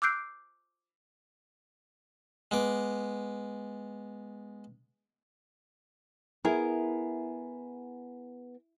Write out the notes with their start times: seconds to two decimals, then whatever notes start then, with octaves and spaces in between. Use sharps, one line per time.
0.02 D6 E6 F#6 G6 C7 D7
2.51 G#3 B3 D6
6.45 B3 E4 G#4 A#4